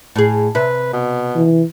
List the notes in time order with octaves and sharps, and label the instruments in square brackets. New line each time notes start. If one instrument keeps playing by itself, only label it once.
[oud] A2 G#4
[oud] C3 E5 [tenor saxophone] B4
[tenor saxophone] B2
[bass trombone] E3